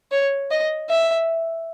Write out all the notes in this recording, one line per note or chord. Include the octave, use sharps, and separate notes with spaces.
C#5
D#5
E5